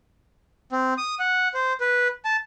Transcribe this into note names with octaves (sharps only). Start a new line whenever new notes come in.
C4
D#6
F#5
C5
B4
A5